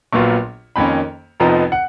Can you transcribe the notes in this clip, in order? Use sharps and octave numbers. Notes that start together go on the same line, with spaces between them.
A#1 A#2 F#3 B3 F4 C#6
F2 D#3 A#3 C#4 B5
F1 F2 F3 B3 D#4 A#5
F#5